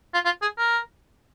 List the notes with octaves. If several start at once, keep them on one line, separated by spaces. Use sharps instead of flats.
F4
F4
G#4
A#4